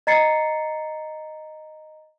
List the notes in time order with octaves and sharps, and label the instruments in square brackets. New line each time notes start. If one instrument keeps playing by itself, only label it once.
[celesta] D#5 A#5 A6 C7 C#7